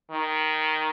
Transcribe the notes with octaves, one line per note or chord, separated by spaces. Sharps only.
D#3